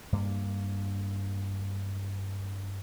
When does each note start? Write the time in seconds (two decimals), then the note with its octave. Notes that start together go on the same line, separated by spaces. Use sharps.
0.12 G2 A#3